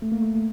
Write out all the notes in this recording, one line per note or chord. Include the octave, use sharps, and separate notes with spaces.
A3
A#3
A3